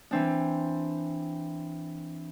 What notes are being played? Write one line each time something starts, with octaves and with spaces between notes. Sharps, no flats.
E3 C4 D4